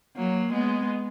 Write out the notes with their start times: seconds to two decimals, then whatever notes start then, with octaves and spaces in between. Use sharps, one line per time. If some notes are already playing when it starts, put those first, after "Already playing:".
0.16 F#3 A#3
0.52 G#3 B3